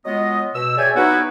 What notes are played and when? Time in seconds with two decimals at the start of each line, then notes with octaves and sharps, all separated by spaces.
0.05 F#3 G#3 B3 F4 D#5
0.55 B2 E6
0.77 G#4 C#5 D5 E5 G5 G#5
0.95 B3 D#4 E4 F#4